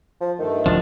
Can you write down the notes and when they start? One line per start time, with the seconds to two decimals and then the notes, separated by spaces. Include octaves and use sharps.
0.21 F3
0.39 G2 D#3 A3
0.66 C#2 A2 F3 C#4 D4